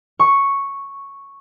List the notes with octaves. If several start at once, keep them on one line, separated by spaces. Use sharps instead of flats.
C#6